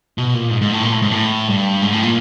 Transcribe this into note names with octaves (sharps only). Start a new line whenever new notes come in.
B2
A#2
G#2
G#2
A2
A#2
A2
G#2
A2
G2
G#2
A2
A#2